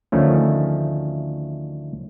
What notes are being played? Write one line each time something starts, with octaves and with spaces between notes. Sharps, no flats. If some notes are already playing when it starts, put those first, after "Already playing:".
D2 D#3 F3 A3 C#4